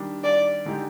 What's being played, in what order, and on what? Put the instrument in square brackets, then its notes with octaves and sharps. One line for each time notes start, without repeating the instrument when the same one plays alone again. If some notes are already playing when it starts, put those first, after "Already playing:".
Already playing: [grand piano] D#3 G3 D4
[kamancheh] D5
[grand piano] D3 G#3 D#4 G4